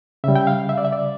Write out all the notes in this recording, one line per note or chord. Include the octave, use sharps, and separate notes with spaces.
C#3 G3 E5
G5
F5
E5
D5
E5
D5